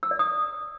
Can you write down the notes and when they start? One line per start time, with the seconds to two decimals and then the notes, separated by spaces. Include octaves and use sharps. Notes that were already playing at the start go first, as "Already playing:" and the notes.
0.03 E6
0.11 D5
0.19 D#6